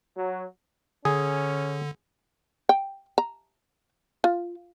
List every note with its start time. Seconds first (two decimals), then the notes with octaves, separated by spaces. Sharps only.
0.16 F#3
1.05 D3 C#4 G#4
2.69 G5
3.18 A#5
4.24 F4